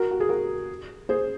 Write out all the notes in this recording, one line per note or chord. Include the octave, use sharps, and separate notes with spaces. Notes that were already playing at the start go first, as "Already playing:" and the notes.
Already playing: F#4 A#4
F#4
G#4
F#4 A#4
G#4 C5